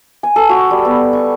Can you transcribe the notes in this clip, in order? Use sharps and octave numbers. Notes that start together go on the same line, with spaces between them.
G#5
A4
F#4
G3
B3
C#6